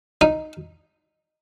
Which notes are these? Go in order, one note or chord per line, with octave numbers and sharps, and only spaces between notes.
D#4